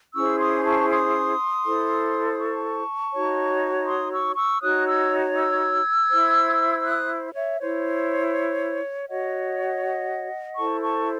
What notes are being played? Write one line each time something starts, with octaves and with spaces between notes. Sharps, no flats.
C#4 E4 G#4 C5 C#6 E6
C6 D#6
A5 C#6
C6 D#6
E4 A4 C5
C6
A5 C#6
D#4 F#4 C#5
C6 D#6
C#6 E6
C#6 E6
D#4 F#4 C#5 D#6 F#6
E6 G#6
E6 G#6
E4 C5
D#6 F#6
C#5 E5
E4 C5 C#5
F#4 C#5 D#5 F#5
E4 A4 C5 A5 C#6
A5 C#6